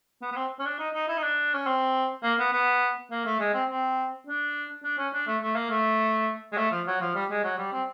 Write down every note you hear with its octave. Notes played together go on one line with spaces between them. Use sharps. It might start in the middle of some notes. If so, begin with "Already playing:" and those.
B3
B3
C4
C#4
D4
D#4
D#4
E4
D#4
D4
C#4
C4
A#3
B3
B3
A#3
A3
G#3
C4
C4
D4
D4
C#4
D4
A3
A3
A#3
A3
G#3
A3
F3
F#3
F3
G3
G#3
F#3
G3
C4